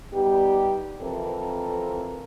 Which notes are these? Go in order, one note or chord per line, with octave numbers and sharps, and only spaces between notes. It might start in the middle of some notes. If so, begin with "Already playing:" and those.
G3 B3 D#4 G4
F2 E3 C4 E4 A4 A#4